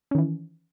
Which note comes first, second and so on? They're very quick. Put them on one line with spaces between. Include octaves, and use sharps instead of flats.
C#4 D#3 E3